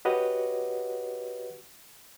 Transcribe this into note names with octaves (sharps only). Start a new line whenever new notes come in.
F#4 G4 B4 C#5 D#5 F#5